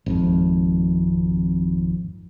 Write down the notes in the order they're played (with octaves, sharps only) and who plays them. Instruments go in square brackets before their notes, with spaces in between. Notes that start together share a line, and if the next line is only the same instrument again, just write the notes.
[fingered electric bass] G#1 F2